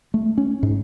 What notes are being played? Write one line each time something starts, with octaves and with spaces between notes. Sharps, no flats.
A3
C#4
G#2